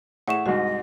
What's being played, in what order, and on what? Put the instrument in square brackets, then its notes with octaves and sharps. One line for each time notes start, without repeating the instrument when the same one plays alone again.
[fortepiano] A2 G#4 E5 [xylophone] F#5 C#6 E7
[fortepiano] C2 G#2 [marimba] F#4 [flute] D#5